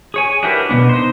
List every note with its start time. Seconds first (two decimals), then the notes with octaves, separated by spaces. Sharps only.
0.14 G#4 C#5 G#5
0.43 D4 E4 F#4 G4 A#4 B4
0.69 B2 F3 B3 D4
0.89 D#4 C5